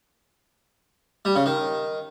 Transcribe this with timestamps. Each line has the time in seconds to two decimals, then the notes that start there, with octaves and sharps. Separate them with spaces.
1.25 G3
1.36 C#3
1.46 D#3